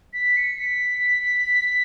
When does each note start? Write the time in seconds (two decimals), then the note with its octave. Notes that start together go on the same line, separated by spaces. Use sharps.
0.13 B6
0.37 C#7
0.59 B6